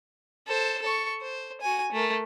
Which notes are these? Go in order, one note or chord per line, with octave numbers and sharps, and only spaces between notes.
A4 C5
A4 C#6
C5
F#4 G#5
A3 A#4